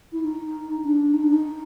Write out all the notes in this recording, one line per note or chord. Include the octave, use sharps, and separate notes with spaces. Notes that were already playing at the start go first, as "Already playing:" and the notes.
E4
D#4
D4
D#4
D4
D#4